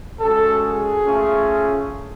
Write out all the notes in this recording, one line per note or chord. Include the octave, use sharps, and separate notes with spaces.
G#3 C#4 F#4 A4
G#4
A3 C#4 F4